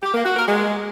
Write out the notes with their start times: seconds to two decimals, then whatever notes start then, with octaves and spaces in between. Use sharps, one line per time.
0.03 G4
0.14 A#3
0.25 F#4
0.36 A#4
0.48 G#3